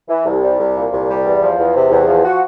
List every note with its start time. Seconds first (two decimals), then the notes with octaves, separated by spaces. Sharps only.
0.09 E3
0.25 C2
0.42 G3
0.59 C2
0.75 A#2
0.91 C2
1.08 G3
1.25 E2
1.41 F3
1.58 E2
1.75 C3
1.91 E2
2.08 F3
2.24 F#4